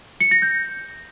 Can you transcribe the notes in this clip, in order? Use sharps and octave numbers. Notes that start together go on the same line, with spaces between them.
C#7
A#6
G6